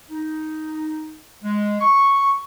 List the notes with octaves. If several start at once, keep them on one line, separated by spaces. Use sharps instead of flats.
D#4
G#3
C#6